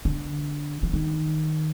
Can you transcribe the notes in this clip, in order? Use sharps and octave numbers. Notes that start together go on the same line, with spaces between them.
D3
F3
D#3